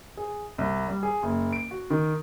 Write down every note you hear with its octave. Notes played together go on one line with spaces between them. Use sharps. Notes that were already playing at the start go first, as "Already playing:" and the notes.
G#4
C2
G3
G#4
F#1
D7
F#4
D#3